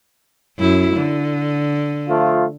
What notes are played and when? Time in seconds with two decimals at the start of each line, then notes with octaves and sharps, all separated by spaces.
0.58 F#2 E4
0.97 D3
2.08 F3 A3 F4